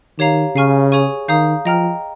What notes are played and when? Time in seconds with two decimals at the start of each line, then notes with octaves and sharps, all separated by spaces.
0.19 D#3 G4 C#5 F5 A#5
0.55 C#3 F5 G#5 C#6 F6
0.92 G#4 C#5 G#5 C#6
1.28 D#3 F5 A#5 D#6 G6
1.65 F3 D#5 G5 A#5 F6